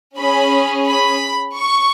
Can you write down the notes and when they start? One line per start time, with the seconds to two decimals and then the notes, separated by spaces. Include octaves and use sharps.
0.17 C#4 G#4 B5
0.88 B5
1.57 C#6